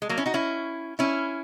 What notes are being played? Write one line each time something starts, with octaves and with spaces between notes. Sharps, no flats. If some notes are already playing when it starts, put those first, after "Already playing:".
G#3
F#3 A#3
C#4 E4
D#4 F#4
C#4 E4
C#4 E4